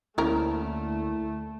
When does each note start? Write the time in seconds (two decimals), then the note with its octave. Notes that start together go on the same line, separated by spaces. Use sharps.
0.18 D2 F3 A3 A#3 C#4 D4 E4 A#4